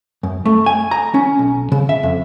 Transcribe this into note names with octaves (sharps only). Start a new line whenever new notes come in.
F#2
A3
G#5
A#5
C#4
B1
C#3
E5
F2